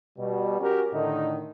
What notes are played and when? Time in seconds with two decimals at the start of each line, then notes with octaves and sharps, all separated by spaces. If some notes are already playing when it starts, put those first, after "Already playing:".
0.18 B2 G3
0.60 C#4 F#4 G4 A#4
0.93 A2 D3 D#3 D#4